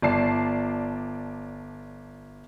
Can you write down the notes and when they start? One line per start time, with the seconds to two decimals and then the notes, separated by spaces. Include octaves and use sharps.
0.02 G1 D5 A5 C7